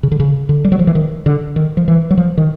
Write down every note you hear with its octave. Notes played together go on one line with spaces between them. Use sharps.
C#3
D3
C#3
D3
G3
F#3
F3
E3
D#3
D3
D#3
F3
E3
F#3
F3
D#3